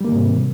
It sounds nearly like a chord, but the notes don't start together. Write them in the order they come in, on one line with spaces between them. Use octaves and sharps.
G3 A#3 D#3 G#2 C3